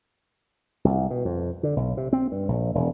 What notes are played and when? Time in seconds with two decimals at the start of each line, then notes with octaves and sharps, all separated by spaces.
0.85 C2
1.11 B2
1.25 F2
1.63 D3
1.76 B1
1.97 C3
2.13 C4
2.32 G2
2.48 A#1
2.75 E1